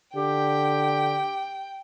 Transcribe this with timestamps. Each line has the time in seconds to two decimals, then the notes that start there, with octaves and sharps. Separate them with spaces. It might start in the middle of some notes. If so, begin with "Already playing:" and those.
0.16 D3 G4 G5